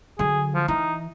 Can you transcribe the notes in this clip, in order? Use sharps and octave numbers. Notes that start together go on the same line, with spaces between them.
D3 F#3 G#4
F3
E3 D#4